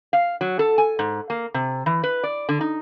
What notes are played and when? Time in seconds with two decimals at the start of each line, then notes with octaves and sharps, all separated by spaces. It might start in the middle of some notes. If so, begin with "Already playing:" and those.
0.13 F5
0.41 F#3
0.59 A4
0.78 G#5
0.99 G#2
1.30 A#3
1.54 C3
1.86 E3
2.04 B4
2.23 D5
2.49 D3
2.61 D#4